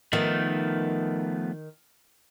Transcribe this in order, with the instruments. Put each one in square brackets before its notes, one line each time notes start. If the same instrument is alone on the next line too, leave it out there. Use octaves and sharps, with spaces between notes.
[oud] D#3 [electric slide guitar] F3 A3 B3